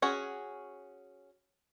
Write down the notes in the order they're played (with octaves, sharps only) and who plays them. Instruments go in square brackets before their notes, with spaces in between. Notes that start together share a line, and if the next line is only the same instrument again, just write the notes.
[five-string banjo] C#4 F#4 G#4